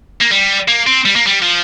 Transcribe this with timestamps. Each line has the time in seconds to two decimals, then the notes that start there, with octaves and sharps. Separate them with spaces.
0.21 A#3
0.31 G3
0.68 A#3
0.87 C4
1.05 G3
1.16 A#3
1.26 G3
1.42 F3